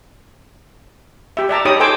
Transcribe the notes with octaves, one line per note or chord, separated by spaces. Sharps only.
G4 E5
D5 E5 A5 A#5
D#4 G4 C#5 D#5 B5 D#6
A4 C5 G5 G#5 D6 E6